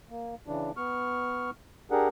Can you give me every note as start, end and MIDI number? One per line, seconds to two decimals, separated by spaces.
0.10 0.35 58
0.47 0.71 49
0.47 0.71 52
0.47 0.71 62
0.77 1.50 59
0.77 1.50 85
0.77 1.50 89
1.91 2.08 62
1.91 2.08 67
1.91 2.08 68
1.91 2.08 70
1.91 2.08 78